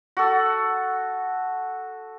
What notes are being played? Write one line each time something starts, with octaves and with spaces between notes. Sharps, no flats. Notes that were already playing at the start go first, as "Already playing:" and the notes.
F#4 A4